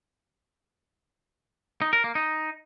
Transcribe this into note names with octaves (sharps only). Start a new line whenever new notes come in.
D#4
A#4
A#3
D#4